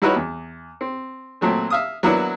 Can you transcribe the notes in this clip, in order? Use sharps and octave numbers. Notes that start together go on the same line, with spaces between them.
G3 D#4 E4 F#4 B4 C#5
E2
C4
A#2 F#3 A3 C4
E5 F5 D#6
F#3 A#3 B3 D4 E4